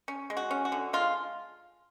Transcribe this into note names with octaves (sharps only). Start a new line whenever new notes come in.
C#4
G#3
F#4
C#4
F#4
D3
G#3 F4